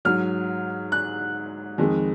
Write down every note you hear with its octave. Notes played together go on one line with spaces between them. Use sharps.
G#2 F#3 F6
F#6
F2 D#3 G#3